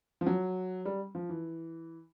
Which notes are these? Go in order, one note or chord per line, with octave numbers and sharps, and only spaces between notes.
F3
F#3
G3
F3
E3